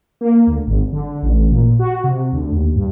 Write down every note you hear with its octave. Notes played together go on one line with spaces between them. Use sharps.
A#3
D2
G#1
D3
A1
A#2
F#4
C3
D2
D#2
G2